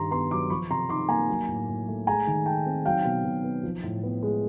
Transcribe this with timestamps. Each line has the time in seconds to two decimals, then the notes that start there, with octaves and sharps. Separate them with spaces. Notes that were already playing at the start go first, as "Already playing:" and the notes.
Already playing: G2 D#3 A#5 C6
0.11 B3 A#5 C6
0.31 F#3 C6 D6
0.50 F3 B5 C#6
0.70 C3 A#5 C6
0.89 D#4 C6 D6
1.09 A#3 G#5 A#5
1.29 F#3
1.48 A2
1.68 A2
1.88 A3
2.07 G#3 G#5 A#5
2.27 D#3
2.46 D#4 G5 A5
2.66 C4
2.85 F#3 F5 G5
3.04 B2
3.24 B2
3.44 B3
3.63 F3
3.83 A2
4.03 B3
4.23 G#3